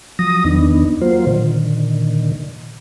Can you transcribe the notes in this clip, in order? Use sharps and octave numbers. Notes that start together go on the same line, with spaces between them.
F3 F#3 D#6 A#6
E2 D#3 B3 D4 D#4
F#3 A#3 F4 C5
A#2 D3 D#3